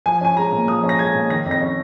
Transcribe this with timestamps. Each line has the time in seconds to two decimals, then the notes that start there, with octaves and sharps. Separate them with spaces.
0.06 F3 G#5
0.21 C#4 G#5
0.37 G#3 A#5
0.52 A#2
0.68 F3 D#6
0.84 C#4
0.89 A#6
0.99 G#3 G#6
1.15 A#2
1.30 D#3 A#6
1.46 F2
1.51 A#6
1.61 C#4